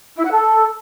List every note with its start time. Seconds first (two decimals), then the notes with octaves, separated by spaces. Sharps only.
0.16 E4
0.23 F#5
0.31 A4